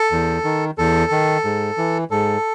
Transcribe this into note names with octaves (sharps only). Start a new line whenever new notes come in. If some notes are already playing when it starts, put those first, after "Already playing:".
Already playing: A4
E2
D#3
E2 A4
D#3
G#2
E3
G#2 A4